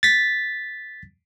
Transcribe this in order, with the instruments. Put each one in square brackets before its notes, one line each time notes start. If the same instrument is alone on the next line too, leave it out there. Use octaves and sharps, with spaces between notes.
[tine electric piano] A6 B6